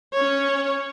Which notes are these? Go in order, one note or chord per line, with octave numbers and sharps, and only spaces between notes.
C#4 C#5